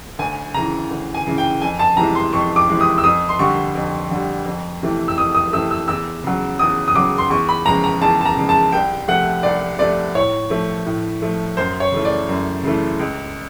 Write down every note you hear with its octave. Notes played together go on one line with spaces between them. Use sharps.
D2 G#5
C#3 E3 A#5
D2
G#5
C#3 E3
G5
F2 G#5
A5
C3 E3 G#3 A#5
C6
F2 C#6
D6
C3 E3 G#3
D#6
E6
F2 D#6
C6
D3 G3 C#6
F2
D3 G3
F2
C3 E3 A3
E6
F2 D#6
D#6
C3 E3 A3 E6
E6
E2 E6
C#3 F#3
E2 D#6
D#6
C#3 F#3 D6
C6
E2 C#6
B5
C#3 F3 G#3 A#5
A#5
E2 A5
A5
A#5
C#3 F3 G#3
A5
C2 G5
C3 F3 A3 F#5
C2 D5
C3 F3 A3 D5
A2 C#5
F3 A3
A2
F3 A3
F#2 C5
C#5
C#3 E3 A3
D5
F#2
C#3 E3 A3
C#2